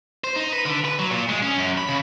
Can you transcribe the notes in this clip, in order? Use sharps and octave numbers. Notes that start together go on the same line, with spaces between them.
C5
D#4
B4
D3
B4
F#3
A#2
G#3
C#4
F#2
B5
C#3